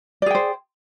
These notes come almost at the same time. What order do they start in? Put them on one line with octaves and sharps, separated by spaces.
D5 G#4 G5 C5